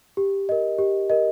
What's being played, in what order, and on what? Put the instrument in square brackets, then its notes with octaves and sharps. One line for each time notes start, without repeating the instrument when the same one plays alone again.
[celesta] G4
A#4 D#5
G4
A#4 D#5